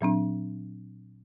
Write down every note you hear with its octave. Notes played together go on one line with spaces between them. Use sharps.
A#2 F#3 C4 D4